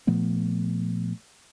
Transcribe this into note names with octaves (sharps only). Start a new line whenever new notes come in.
A#2 F3 A3 B3